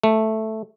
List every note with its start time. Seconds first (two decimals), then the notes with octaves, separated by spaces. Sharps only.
0.04 A3